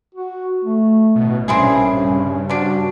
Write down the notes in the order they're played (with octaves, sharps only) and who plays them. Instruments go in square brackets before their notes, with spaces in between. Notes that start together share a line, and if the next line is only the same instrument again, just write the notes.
[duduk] F#4
A3
[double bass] A1 [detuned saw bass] B2
[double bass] A#1 C3 [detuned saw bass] G2 [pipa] C4 E4 G#4 [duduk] C#4
[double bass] C#3
[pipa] F3 D4 [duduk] F#4